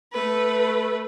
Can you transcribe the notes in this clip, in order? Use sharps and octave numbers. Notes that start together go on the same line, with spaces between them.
A3 B4